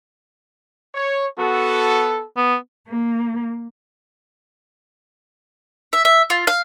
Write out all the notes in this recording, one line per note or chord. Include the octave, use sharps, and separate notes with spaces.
C#5
B3 F#4 A4
B3
A#3
E5
E5
F4
F5